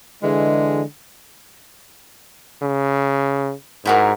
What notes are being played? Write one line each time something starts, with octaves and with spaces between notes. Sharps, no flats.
D3 E3 G#3
C#3
G#2 E4 F#4 A#4